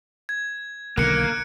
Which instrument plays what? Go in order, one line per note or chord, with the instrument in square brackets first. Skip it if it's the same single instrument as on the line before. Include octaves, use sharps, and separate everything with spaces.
[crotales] G#6
[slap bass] B1 D3 D#3 [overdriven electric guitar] A#3 [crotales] F#6 C#7 D7